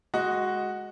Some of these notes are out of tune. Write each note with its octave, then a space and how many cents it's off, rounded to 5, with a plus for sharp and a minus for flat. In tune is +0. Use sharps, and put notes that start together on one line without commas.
G#3 +0 F#4 +0 D#5 +0